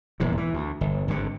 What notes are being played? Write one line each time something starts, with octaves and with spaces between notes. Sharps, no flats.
D#1 E2 G#2 C3
E3
D2
G1
G#1 G2 D3